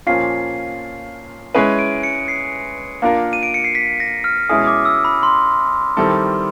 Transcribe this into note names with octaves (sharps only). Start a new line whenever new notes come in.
A#2 F3 A#3 C#4 F4 C7
G#3 C#4 E4 G#4 B4 D#7
D7
C#7
C7
A#3 D4 F4 A#4
D#7
D7
C#7
C7
B6
A#6
F6
B2 G#3 C#4 E4 G#4 D#6
D6
E6
B5
C6
D#3 G3 C4 E4 A4